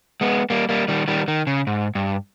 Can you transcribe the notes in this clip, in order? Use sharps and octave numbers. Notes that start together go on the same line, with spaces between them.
G#3 B3
G3 A#3
G3 A#3
D#3 G3
D#3 G3
D#3
C#3
G#2
G2